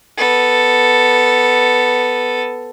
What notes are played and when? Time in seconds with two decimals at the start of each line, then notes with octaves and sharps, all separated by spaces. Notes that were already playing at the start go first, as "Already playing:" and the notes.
0.17 B3 A4